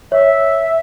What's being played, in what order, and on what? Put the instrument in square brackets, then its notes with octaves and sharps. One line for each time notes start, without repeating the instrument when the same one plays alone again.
[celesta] C#5 [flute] E5